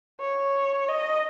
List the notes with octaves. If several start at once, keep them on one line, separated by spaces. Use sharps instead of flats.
C#5
D#5